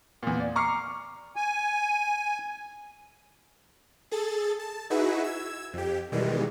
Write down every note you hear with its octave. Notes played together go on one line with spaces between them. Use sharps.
E2 A#2
D5
A#5 C#6 D6 F6 C7 C#7
G#5
G#4 A4 A6
A5
D#4 E4 F#4 G#4 B4 E5
E6 G#6
F2 G4
B2 D#3 E3 G3 G#3